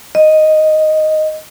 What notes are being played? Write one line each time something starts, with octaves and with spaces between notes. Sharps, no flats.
D#5